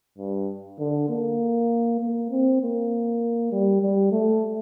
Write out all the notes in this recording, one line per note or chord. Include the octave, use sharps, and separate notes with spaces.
G2
D3
A#3
A#3
C4
A#3
G3
G3
A3